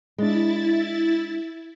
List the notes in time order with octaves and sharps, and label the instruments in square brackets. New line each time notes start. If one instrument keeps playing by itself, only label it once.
[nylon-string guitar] G#3 D4 [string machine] E4 A6